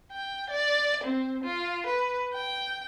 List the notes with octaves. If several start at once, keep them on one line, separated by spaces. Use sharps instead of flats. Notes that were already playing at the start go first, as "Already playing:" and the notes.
G5
D5
C4
F4
B4
G5